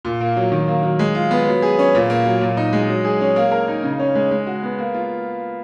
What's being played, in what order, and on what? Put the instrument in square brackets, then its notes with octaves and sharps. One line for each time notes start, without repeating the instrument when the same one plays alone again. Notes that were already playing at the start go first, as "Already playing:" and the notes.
[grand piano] A#2
A#3
F#3
D#3
A#3
F#3
G#3
F4
B3
F#3
G#4
C#4
A#2
A#3
F#3
A#2
D#4
G#3
F#3
G#4
C#4
A#3
A#4
D#4
C#3
C#4
G#3
G#3
F#4
B3
A#3
F4